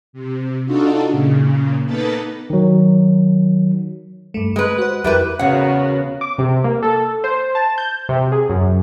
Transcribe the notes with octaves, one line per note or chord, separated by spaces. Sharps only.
C3
D4 D#4 F4 F#4 A4
A#2 C#3
A#3 B3 D#4 A4 B4 A5
D#3 F#3
G2 A3
G#3 B4
F#4 C5
F2 G3 E4 A#4 B4
E2 C#3 B3 F#4 A#4 F#5
D6
C3
A#3
A4
C5
A5
G6
C3
G#4
F#2